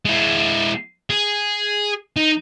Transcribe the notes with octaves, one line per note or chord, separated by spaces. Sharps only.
G#3 E4
G#4
D#4